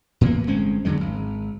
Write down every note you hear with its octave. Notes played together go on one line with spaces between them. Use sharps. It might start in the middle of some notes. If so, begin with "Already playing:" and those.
A2 E3 A#3 B3
G1 G#3 C4 C#4
E2 D3 F#3 G#3
G#1